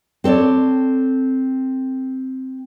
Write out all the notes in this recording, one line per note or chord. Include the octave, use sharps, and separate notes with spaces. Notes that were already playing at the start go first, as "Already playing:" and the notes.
C4 A4 C#5 D5